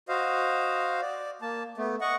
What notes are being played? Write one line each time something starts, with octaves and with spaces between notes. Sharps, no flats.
F#4 C5 D#5 F5
D5
A#3 A5
A3 B3
D#5 F#5 C#6